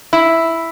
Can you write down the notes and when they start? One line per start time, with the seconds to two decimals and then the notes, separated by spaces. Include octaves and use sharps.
0.13 E4